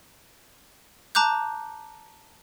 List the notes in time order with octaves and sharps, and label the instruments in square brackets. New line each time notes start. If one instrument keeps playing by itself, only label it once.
[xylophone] A5 A#5 D6 F#6 G6